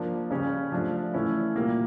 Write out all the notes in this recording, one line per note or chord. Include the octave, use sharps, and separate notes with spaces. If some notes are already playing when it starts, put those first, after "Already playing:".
Already playing: F3 A#3 D4
C#3 G3 C#4
F3 A3 D4
E3 A3 C#4 E4
A#2 G3 A#3